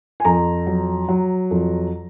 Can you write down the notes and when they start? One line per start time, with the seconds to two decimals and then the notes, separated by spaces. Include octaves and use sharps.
0.20 G#5
0.25 F2 A#5
0.67 F#3
1.08 F#3
1.51 F2